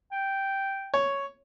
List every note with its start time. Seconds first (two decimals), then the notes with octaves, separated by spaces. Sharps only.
0.12 G5
0.94 C#5